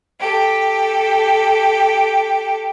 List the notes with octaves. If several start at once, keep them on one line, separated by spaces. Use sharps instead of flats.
G4 A4